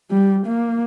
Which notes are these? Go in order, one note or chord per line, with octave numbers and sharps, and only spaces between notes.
G3
A#3